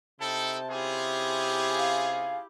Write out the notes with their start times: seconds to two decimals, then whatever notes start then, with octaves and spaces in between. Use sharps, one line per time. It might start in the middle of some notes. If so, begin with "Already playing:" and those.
0.21 C3 D#4 E4 A4 G5 A5
0.71 C#4 E4 F4 G4 G#4
1.77 F5